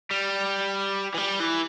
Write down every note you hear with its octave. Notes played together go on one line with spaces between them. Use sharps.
G3
E3
G3
E3